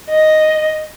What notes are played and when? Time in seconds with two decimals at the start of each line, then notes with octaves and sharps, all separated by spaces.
0.10 D#5